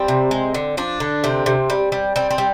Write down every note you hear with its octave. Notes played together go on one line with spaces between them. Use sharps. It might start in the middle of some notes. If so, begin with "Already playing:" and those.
Already playing: G3 C4
C3
G#3
D3
F3 D4
D3
C3 C4
C3
G3
G3
G3 C4
C4
G3